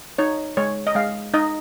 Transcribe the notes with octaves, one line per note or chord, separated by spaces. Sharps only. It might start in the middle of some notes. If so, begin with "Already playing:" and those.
D#4 C#5
G#3 C#5
D#5
G#3 F5
D#4 D#5